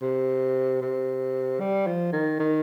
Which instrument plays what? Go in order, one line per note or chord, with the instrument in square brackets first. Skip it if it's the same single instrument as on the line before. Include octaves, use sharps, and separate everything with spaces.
[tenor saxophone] C3
C3
G3
F3
D#3
D#3